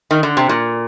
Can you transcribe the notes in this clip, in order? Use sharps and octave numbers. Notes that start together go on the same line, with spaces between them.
D#3
D3
C3
A#2